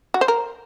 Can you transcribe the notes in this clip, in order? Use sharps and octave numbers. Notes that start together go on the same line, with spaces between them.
F#4
C5
A#4